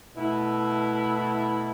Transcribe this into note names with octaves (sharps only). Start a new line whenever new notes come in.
B2 A3 E4